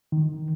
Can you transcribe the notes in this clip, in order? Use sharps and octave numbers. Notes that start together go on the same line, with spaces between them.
D#3